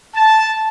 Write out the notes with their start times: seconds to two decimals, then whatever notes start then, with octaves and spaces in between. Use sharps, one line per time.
0.15 A5